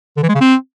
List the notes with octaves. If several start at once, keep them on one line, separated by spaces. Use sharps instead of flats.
D3
E3
G#3
C#3
C4